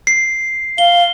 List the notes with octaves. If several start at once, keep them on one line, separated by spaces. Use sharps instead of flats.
C7
F5 G7